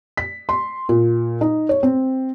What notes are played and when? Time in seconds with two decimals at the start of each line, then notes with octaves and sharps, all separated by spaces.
0.17 B6
0.49 C6
0.89 A#2
1.41 D#4
1.69 C#5
1.83 C4